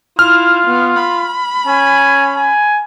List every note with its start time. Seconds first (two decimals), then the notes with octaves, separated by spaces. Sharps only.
0.19 E4 F4 F6
0.67 B3
1.00 B5
1.67 C#4 G#5
2.37 G#5